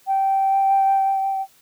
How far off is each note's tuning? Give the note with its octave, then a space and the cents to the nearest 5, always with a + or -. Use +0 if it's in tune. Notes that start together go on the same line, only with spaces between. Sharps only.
G5 -15